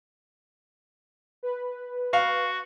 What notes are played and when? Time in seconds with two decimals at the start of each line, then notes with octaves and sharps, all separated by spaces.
1.43 B4
2.13 F#4 F5